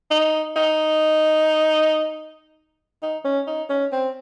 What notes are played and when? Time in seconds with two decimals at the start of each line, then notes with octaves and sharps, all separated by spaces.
0.10 D#4
0.56 D#4
3.03 D#4
3.24 C#4
3.47 D#4
3.69 C#4
3.92 C4